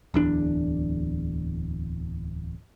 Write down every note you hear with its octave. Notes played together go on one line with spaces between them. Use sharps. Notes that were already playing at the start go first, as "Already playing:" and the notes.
D1 E2 D4